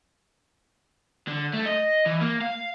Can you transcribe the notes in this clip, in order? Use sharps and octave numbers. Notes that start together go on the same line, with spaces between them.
D3
A3
D#5
E3
A#3
F5